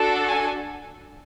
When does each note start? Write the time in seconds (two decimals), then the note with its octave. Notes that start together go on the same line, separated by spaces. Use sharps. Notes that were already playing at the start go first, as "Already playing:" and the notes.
Already playing: D4 F#4 A4
0.28 G#5